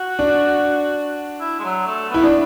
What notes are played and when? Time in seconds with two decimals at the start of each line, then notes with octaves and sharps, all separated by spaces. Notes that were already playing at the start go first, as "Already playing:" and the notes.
Already playing: F#4
0.19 D4
1.41 E4
1.60 G#3
1.64 F#3
1.86 A3
2.10 B3 E4
2.23 D4